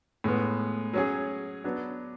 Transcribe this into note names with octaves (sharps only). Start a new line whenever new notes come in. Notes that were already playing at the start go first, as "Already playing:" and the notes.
A2 G#3 B3
F#3 C#4 G#4
F#3 B3 D4